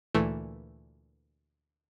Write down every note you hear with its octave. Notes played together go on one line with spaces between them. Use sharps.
D2 A#2 E3 A3